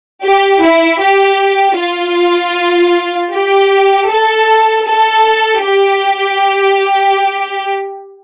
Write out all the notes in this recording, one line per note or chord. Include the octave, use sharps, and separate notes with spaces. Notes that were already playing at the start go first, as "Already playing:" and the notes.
G4
E4
G4
F4
G4
A4
A4
G4